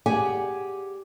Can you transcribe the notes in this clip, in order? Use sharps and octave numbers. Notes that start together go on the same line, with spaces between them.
G4 G#4 D5 F#5 G#5